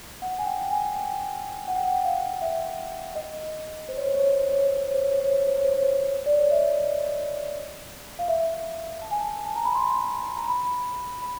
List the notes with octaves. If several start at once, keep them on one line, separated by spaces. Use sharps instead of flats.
F#5
G#5
G5
G#5
G5
F#5
G5
F#5
F5
E5
D#5
C5
C#5
C5
C#5
C5
C#5
C5
C#5
C5
C#5
C5
C#5
C5
C#5
C5
C#5
C5
C#5
C5
C#5
C5
C#5
C5
D5
C#5
E5
D#5
F5
E5
A5
G#5
A5
A5
A#5
B5
C6
A#5
B5
B5